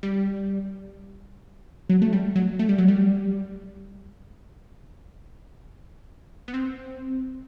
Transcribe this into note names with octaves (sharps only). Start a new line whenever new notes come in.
G3
F#3
A3
G3
F#3
A3
G3
F#3
G3
B3
C4